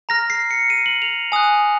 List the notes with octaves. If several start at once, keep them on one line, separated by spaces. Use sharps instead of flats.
A#5 F6 A#6
C7
C#7
D#7
F#7
F7
G#5 D#6 F#6